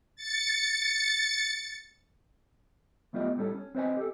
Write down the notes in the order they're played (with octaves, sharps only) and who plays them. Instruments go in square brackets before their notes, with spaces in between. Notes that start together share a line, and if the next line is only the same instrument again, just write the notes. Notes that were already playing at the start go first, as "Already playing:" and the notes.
[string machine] A6 C#7
[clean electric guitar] F#2 A3 B3 F4 G4 D#5
A2 G3 A3 C#4 A4
C#4
C4 B4 C5 D5 D#5 G#5
G4 A4